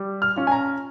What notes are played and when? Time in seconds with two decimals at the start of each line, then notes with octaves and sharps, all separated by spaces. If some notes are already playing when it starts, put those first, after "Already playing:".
Already playing: G3
0.22 F6
0.36 C#4 F4
0.47 G#5
0.52 A#5